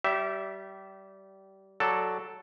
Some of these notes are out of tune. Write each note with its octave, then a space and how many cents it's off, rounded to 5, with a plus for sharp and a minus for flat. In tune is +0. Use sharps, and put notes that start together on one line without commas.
G3 -25 G4 -25 E5 +0
F#3 +0 A4 +0 D5 +10